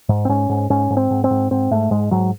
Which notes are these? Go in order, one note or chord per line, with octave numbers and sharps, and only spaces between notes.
G#2
C4
G#2 C#4
G#2
G#2 C#4
G#2
C4
G#2
C4
G#2
G#2 C4
G#2 A3
G#2 G#3
G#2 F#3